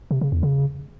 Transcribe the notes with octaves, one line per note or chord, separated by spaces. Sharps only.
C3
C#3
E2
C#3